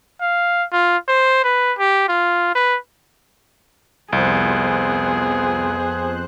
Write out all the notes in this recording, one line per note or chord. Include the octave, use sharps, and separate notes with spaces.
F5
F4
C5
B4
G4
F4
B4
C2 F2 B3 G#4 C5 F#6